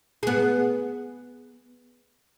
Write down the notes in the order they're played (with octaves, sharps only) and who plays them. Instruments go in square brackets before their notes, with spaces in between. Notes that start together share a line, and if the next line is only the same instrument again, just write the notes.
[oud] B3 G#4